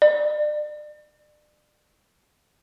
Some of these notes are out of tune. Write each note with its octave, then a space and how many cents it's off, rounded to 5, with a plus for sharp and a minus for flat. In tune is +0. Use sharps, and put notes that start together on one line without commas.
D5 +35